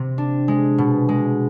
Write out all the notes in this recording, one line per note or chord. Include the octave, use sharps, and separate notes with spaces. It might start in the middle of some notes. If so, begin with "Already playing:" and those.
Already playing: C3 C4
D4
G#3
B2
G#3